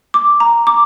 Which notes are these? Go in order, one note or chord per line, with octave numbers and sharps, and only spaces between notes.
D6
A#5
D6